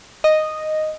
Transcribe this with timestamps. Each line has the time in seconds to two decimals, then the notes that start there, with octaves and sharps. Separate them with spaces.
0.24 D#5